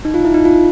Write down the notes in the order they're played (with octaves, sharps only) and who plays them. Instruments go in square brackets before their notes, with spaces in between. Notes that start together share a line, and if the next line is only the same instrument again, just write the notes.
[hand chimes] D#4
F4
E4
D#4
F4